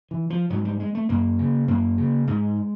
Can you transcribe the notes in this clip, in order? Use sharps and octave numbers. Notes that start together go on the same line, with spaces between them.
E3
F3
G#2 F#3
G3
G#3
A3
F#2 A#3
C#3
F#2 A#3
C#3
G#2 G#3